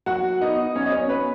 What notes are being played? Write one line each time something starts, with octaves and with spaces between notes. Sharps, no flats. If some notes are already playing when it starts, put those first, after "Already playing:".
F#3 F#4 F#5
B3 D#4 D#5
F#3 C#4 C#5
D#5
C#4 C#5
B3 B4